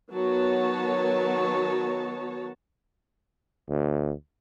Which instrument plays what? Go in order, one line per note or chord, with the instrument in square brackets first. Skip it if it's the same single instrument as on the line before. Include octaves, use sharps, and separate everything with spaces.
[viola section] D#3 F#3 B3 F#4 C#5 A5
[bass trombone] D2